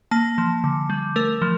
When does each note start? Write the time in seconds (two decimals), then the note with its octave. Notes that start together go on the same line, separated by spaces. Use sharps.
0.11 A#3 A5
0.38 F3
0.64 D3
0.90 G3
1.16 A3 A#4
1.42 F3